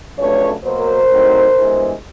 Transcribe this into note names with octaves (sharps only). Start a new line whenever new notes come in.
F2 C#3 F#3 A3 D4 B4 C#5
B2 F#3 A#3 A#4 C5
A2 F#3 A3 C4 D#4
G2 E3 G#3 B3